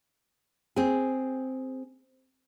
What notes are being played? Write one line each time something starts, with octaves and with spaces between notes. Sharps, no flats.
C4 G#4